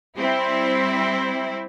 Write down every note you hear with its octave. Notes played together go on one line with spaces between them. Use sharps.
G3 C4 E4